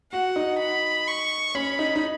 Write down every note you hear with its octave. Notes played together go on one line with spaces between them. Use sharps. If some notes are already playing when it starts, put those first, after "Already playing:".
F#4 F#5
D#4
B5
C#6
C#4 B5
D#4
D#4